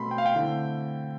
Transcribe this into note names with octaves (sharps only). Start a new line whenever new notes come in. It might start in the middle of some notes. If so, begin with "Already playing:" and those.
Already playing: B2 A3 C4 B5 C6
G5
F5
G5
D3 A3 C4 E4